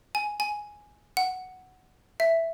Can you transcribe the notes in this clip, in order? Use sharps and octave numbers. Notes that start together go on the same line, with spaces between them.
G#5
G#5
F#5
E5